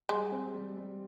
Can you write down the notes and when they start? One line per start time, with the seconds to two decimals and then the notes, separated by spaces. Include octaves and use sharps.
0.09 G3 G#3
0.32 C4
0.54 G3
0.77 G3